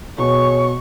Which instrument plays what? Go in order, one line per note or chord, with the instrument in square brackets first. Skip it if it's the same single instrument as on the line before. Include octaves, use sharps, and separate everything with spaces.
[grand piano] B2 [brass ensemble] G#4 C#5 [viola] C#6